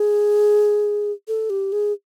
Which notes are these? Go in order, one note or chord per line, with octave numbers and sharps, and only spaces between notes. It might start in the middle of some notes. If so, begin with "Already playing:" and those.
Already playing: G#4
A4
G4
G#4